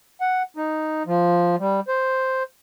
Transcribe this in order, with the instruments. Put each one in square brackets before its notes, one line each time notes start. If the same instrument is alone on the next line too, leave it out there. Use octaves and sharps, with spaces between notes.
[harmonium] F#5
D#4
F3
G3
C5